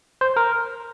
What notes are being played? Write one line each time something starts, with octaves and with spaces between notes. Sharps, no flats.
C5
A#4